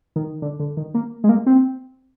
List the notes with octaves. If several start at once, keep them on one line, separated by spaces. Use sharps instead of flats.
D#3
D3
D3
D#3
A#3
G#3
A#3
C4